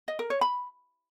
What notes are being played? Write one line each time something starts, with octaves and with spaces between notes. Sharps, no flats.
D#5
A#4
C#5
B5